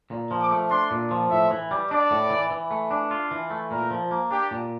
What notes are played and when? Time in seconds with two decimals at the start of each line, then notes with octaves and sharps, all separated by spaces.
0.11 A#2
0.31 F3
0.42 D6
0.51 A3
0.71 D4 C6
0.91 A#2
1.11 F3
1.30 A2 E5
1.51 E3
1.71 G3
1.91 D4 D5
2.11 A2
2.30 E3
2.51 E3
2.71 A3
2.91 D4
3.11 F4
3.31 E3
3.50 A3
3.71 A#2 A#4
3.91 F3
4.11 A#3
4.31 D4 G4
4.51 A#2